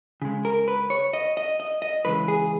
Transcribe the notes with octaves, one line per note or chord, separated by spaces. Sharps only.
C#3 G#3
A#4
B4
C#5
D#5
D#5
D#5
D#5
C#3 E3 G#3 B4
G#4